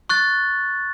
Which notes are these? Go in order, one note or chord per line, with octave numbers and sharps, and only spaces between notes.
C#6 F#6 A6